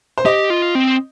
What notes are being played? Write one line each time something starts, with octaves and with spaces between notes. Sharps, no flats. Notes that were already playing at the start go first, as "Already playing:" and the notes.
C5
G4 D#5
F4
C4